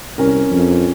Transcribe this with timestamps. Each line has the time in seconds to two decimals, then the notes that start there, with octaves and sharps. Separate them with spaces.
0.18 C2 C#4 A#4
0.51 F2